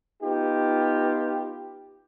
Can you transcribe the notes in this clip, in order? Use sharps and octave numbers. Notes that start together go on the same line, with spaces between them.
B3 D#4 F4 G4